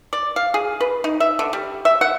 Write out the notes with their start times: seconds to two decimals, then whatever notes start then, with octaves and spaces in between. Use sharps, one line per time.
0.13 D5
0.36 F5
0.54 G#4
0.81 B4
1.04 D#4
1.20 E5
1.39 D3
1.53 G3
1.85 E5
2.01 F#5